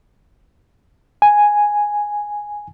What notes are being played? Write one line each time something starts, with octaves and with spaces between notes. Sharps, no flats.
G#5